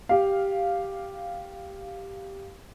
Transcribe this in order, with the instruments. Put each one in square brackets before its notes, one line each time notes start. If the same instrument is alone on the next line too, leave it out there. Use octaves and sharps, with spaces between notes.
[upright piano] G4 F5